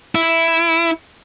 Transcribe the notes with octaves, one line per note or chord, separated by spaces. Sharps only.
E4